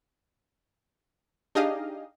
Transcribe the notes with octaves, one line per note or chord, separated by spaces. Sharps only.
D4 D#4 G4 G#4 D#5 F5